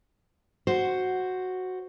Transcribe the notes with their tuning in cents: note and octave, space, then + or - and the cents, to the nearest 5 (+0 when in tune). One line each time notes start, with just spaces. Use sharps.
F#4 +0 C5 +0